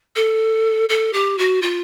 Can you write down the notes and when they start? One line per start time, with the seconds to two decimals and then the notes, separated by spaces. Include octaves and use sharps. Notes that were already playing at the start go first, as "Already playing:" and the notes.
0.16 A4
0.89 A4
1.13 G4
1.38 F#4
1.62 F4